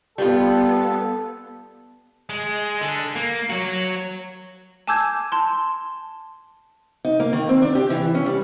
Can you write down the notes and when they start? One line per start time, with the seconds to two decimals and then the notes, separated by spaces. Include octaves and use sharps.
0.18 G3 B3 F4 A4
2.30 G#3
2.81 D3
3.16 A#3
3.50 F#3 F#4
4.87 G#5 A5 D6 E6 G6 G#6
5.32 A5 C6
7.05 D#4
7.20 A#3
7.33 D#3
7.49 C4
7.62 D4
7.75 G4
7.90 E3
8.15 C#4
8.26 G3